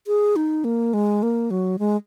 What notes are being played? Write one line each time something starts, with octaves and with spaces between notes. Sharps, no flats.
G#4
D#4
A#3
G#3
A#3
F#3
G#3